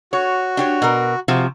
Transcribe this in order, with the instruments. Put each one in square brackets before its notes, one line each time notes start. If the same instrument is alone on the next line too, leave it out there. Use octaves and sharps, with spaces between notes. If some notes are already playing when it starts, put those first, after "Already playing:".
[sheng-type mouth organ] F#4 [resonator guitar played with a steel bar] C#5
[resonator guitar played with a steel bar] D4 G4 C#5
B2 A#4
C3 F3 F#4